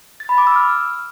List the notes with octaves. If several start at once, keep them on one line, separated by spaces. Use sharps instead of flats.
A6
B5
D6
E6
F6